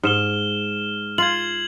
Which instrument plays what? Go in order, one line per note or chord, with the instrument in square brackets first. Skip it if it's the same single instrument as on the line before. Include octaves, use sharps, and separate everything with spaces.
[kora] G#2 [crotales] F6 E7 G7
[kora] F4 [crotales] G#6 C7 F#7